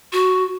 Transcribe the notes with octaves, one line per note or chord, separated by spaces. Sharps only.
F#4